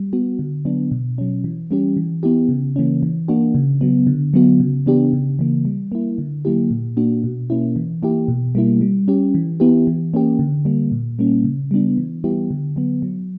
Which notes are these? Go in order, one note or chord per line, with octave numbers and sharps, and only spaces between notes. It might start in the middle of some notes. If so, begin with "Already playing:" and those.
Already playing: G3
B3 F#4
D3
F#3 B3 D4
B2
F#3 C#4
E3
G3 C#4 G4
E3
B3 E4 G4
C#3
E3 A#3 C#4
E3
A#3 D4 F#4
C#3
F#3 B3
D3
F#3 B3 F#4
C#3
E3 B3 D4 G4
C#3
E3 A#3
G3
A#3 E4
D3
F#3 A#3 E4 G4
A#2
A#3 D4 F#4
B2
A#3 C#4 E4
E3
A#3 E4 G4
B2
G3 A#3 E4
G3
C#4 G4
E3
B3 E4 G4
E3
A#3 C#4 G4
D3
G3 A#3
A#2
G3 A#3 C#4
C#3
G3 B3 D4
E3
G3 B3 E4 G4
D3
F#3 B3
F#3